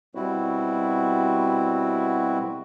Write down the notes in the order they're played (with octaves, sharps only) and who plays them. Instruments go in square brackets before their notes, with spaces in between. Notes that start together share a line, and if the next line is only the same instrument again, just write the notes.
[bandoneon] B2 G3 C4 E4 F#4